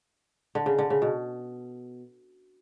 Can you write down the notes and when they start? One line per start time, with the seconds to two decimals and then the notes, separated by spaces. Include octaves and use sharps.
0.55 D3
0.66 C#3
0.79 D3
0.90 C#3
1.02 B2